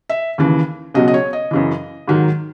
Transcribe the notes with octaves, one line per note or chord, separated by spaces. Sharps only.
E5
D#2 C#3 E3
C#2 B2 F#3 D#5
D#5
C#5
D#5
F#2 C#3 E3
G#2 D#3 F#3